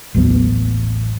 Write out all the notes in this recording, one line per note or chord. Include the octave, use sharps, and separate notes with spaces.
A1 D#2 F#3 B3